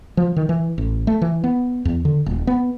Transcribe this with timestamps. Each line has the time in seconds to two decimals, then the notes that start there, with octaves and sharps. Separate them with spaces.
0.17 F3
0.36 D#3
0.49 E3
0.78 A1
1.07 A3
1.22 E3
1.44 B3
1.85 E2
2.05 D3
2.26 D#1
2.47 B3